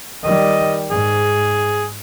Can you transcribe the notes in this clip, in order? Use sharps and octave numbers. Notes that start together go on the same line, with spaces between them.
D#3 G3 D#5
G#2 G#4